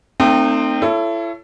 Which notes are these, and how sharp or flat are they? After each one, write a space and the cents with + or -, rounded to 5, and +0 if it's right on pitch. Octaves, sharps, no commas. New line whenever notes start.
A3 +40 C4 +0 D#4 -30
E4 +35 A4 +0 C#5 +5